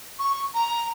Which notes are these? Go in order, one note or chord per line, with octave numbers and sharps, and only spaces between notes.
C#6
A#5